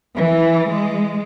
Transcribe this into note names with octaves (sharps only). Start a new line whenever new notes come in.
E3
G#3